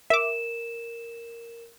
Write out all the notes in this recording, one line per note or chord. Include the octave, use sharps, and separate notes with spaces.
A#4 E5 D6 E7